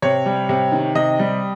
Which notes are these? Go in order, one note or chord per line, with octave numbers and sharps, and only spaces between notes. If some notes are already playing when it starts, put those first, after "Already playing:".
C3 C#5
G3
C3
D#3
C3 D#5
G3